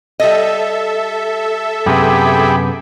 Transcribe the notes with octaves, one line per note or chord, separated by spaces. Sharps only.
G3 A4 D#5 E5
F#2 C3 B3 G4 G#4 B5